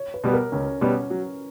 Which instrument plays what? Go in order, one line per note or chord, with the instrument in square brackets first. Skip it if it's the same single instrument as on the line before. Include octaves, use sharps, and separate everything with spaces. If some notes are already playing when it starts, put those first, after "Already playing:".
Already playing: [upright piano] C#5
B4
[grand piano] B2 G3 B3
[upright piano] A#4
[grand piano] C#2 [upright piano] C#4
[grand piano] B2 G3 B3 [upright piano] C#4
[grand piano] F#3